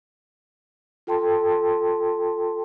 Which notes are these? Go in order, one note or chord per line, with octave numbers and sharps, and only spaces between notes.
F4 A4 G5 A5 C6